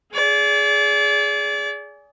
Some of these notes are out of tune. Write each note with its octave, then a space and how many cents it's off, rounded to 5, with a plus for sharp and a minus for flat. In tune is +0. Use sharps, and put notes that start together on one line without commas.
G#4 +10 D5 -30